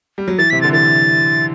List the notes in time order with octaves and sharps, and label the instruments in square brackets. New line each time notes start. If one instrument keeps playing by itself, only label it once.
[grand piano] G3
F#3
[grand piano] E3 [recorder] A6
[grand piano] C3 [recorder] B6
[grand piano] D3 [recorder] A6
[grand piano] E3 [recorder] A6